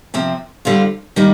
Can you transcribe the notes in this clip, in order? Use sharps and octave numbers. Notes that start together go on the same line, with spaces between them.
C3 F3 C4
D3 G3 C4 F4
D#3 G3 A#3 D#4